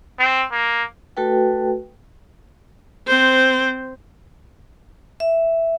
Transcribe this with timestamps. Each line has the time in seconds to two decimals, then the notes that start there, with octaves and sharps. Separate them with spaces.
0.19 C4
0.51 A#3
1.17 A3 F#4 A4 B4 G5
3.07 C4 C5
5.20 E5